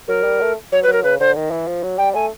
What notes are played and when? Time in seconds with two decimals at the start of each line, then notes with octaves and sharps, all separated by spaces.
0.08 F#3 A#4
0.24 G3
0.41 A3
0.72 F#3 C#5
0.83 B4
0.87 F#3
0.93 A#4
1.04 C#3 B4
1.20 D3 C5
1.36 D#3
1.51 E3
1.67 F3
1.83 F#3
1.98 G3 G5
2.15 A3 G#5